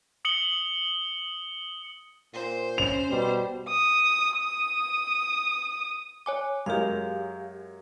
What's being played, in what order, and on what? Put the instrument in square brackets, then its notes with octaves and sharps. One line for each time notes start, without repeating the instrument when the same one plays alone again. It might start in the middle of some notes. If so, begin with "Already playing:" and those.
[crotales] D#6 C#7 F#7 G7
[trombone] A#2 [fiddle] C5
[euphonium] C#4 [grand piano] F7
[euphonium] B2 [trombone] G3
[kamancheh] D#6
D#6
[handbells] C#5 G#5 D6
[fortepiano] F#2 G#3 A#4 [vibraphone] G4 F5